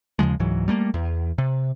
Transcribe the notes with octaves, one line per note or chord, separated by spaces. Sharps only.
D#2 C#3 F3 G#3
C#2 G#2 E3 F#3
G3 A3 A#3
E2
C3